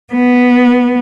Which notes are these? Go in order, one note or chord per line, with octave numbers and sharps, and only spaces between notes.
B3